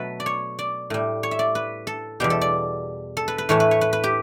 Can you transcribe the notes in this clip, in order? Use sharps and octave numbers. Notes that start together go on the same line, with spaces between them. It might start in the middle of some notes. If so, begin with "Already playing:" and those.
Already playing: B2 F#3 A3 A4 B4
D5
C#5
D5
A2 G3
C#5
E5
D5
B4
A4
E2 B2 G3 G4
A4
D5
A4
B4
B4
A2 E3 A3 C#5
B4
C#5
B4
B4
G4